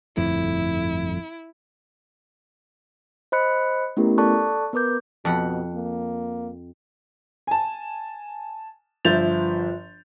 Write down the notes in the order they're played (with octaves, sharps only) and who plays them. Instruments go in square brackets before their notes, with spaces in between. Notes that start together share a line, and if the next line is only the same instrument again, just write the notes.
[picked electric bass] G1 F2 A2 [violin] E4
[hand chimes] C5 D#5 B5 F#6 C#7
A3 B3 C#4 E4 G4 A#4
A4 D5 A5 C#6 F#6
B3 A#4 B4 D6 G6
[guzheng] F2 F#5 B5 [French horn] B2
[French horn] A#3
[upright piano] G#5 A5
G1 F3 E5 G6 A6 F7